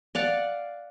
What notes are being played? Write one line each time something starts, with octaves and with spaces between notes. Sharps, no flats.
D5 F5 F#5